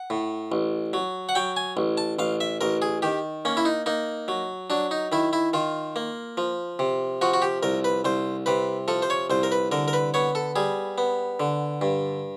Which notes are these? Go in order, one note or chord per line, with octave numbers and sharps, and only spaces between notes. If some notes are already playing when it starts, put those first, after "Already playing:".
Already playing: F#5
A2
A1
F#3
F#5
F#3 G5
G#5
A1
A5
A1 F5
E5
A1 A#4
G#4
D#3 G4
A#3 C#4
E4
D#4
A#3 D#4
F#3
F#3 D4
D#4
D#3 E4
E4
D#3 F4
A#3
F3
C3
F3 F#4
F#4
G4
C2 A#4
B4
C2 C5
C3 B4
F3 A4
C5
C#5
C2 C5
A#4
B4
D3 A#4
A#4
B4
B3 C#5
A4
G3 G#4
B3
D3
G2